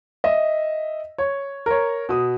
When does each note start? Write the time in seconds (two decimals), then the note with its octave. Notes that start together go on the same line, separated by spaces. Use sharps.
0.24 D#5 E5
1.18 C#5
1.66 A#4 C#5
2.09 B2 D#6